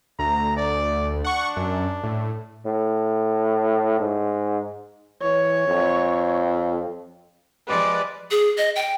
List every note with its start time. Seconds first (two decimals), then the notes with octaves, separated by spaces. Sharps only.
0.19 D2 A#5
0.57 D5
1.25 D4 F#5 C#6
1.57 F#2
2.04 A2
2.66 A2
4.00 G#2
5.22 E3 C#5
5.68 F2
7.68 F3 G3 G#3 B4 D5
8.31 G#4
8.58 D#5
8.76 G5